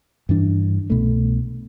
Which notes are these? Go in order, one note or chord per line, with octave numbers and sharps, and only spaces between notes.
G2 E3 G3 D4
C2 B2 A3